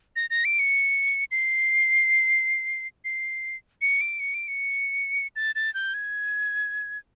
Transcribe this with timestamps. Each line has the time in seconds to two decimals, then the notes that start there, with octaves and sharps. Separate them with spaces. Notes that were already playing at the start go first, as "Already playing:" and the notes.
0.16 A#6
0.30 A#6
0.45 D7
0.59 C#7
1.31 C7
3.05 C7
3.82 C#7
4.01 D7
4.20 C#7
4.34 D7
4.48 C#7
5.36 A6
5.55 A6
5.74 G6
5.94 G#6